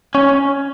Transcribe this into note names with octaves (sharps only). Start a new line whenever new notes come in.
C#4